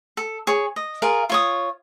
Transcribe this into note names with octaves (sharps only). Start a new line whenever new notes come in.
A4
G#4 C#5
D#5
F4 G#4 A#4 F5
F4 C#5 D#6